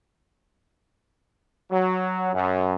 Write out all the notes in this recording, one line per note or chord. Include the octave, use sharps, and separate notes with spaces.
F#3
F#2